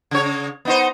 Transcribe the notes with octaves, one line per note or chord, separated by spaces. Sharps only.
C#3 C#5
B3 D#4 C5